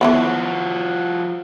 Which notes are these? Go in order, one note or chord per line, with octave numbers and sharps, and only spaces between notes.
E3 F3 A#3 B3 F#4